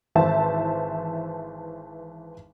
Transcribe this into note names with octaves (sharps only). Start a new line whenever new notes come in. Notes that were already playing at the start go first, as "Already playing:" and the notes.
G#1 E3 C5 E5 A5